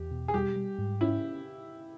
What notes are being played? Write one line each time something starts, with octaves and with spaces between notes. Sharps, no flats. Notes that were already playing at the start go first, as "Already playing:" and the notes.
Already playing: E2 G4
B2
G#4
G3 G4
G3
G#2
C#4 E4